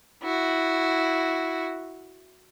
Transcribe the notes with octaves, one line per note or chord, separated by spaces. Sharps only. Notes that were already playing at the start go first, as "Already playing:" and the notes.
E4 F#4